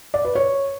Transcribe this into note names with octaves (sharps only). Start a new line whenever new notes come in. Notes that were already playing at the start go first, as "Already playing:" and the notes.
D5
B4
C#5